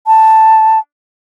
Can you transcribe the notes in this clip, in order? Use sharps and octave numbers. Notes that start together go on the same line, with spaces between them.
A5